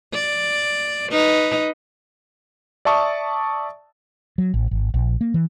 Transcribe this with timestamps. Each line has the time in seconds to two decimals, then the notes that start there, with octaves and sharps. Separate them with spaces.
0.14 D5
1.12 D#4 B4
2.85 D5 E5 A5 C#6 D#6
4.38 F#3
4.54 A1
4.71 G#1
4.94 A#1
5.21 A#3
5.34 E3